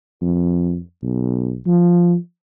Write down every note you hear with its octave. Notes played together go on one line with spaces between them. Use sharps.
F2
B1
F3